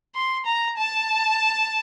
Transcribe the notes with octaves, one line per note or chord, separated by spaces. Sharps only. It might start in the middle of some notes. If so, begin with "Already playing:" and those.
C6
A#5
A5